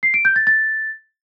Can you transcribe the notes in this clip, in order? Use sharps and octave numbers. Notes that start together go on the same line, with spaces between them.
C7
D7
G6
A6
A6